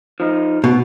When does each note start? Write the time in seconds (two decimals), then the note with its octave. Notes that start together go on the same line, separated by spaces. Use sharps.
0.20 F3 D#4
0.64 B2